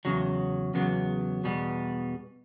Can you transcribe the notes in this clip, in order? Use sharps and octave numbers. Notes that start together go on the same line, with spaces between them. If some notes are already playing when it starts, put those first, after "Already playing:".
E2 C#3 F#3
E2 C#3 F#3 B3
E2 B2 G3 B3